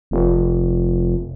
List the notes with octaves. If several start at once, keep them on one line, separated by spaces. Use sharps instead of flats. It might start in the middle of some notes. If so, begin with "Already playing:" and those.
F1